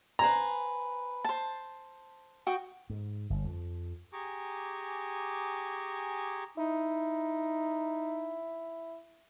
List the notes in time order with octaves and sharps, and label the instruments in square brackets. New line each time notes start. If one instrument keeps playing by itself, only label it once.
[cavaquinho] B4 C5 G#5 [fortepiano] A#5
[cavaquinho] C5 A5
F#4 G5 D#6
[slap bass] G#2
G1
F2
[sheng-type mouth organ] G4 G#4 G#5 A#5 C#6 D6
[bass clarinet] D#4 [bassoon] E4